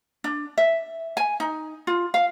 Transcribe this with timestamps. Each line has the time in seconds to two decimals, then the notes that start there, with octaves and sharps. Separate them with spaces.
0.24 D4
0.58 E5
1.17 G#5
1.40 D#4
1.87 F4
2.14 F5